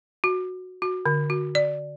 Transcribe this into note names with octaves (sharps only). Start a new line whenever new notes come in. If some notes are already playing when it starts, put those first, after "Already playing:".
F#4
F#4
D3
F#4
D5